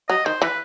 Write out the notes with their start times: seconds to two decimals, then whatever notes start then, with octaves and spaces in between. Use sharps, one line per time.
0.09 F#3 D#5
0.26 D#3 C5
0.42 E3 B4